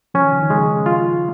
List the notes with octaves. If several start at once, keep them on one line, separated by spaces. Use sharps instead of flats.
F3 C#4
D#3
C#3
D#3
G#3
F4